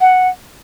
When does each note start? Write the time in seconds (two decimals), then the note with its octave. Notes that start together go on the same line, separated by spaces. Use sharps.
0.01 F#5